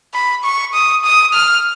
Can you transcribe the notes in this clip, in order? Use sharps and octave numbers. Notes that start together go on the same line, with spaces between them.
B5
C#6
D#6
D#6
F6